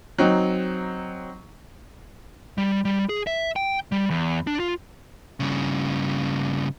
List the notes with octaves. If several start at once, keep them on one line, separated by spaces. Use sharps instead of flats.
F#3 C4 D#4
G3
G3
G#4
E5
G5
G3
E2
D4
F4
G2 C#3